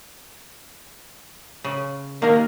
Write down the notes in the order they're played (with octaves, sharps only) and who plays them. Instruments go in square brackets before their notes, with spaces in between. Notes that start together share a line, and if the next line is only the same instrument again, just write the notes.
[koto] C#3
[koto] D#3 A#4 [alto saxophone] A#3